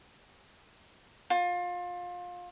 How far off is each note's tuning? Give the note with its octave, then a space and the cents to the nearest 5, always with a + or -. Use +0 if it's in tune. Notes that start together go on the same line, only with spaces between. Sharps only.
F4 +25